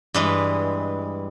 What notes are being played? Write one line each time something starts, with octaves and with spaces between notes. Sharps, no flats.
G2 E3 G#3